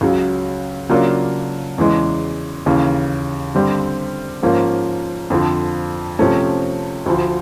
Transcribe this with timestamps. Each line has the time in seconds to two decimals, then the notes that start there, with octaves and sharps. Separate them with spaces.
0.01 C#2 C#3 F#3
0.89 C#3 F#3 A#3 D4 F4
1.78 E2 C#3 E3 G#3
2.66 D#2 C#3 E3
3.54 G2 D3 G3 C4
4.42 G#2 F3 A#3 C#4 F4
5.30 F2 D3 F3
6.19 C3 F3 A3 C#4
7.06 D2 D3 F3